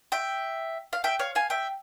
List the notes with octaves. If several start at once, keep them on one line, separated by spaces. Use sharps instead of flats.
E5 G5
F5
E5 G5
C#5 F5
F5 G#5
E5 G5